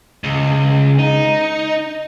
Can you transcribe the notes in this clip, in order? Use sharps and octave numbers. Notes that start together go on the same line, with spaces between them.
C#2
D#4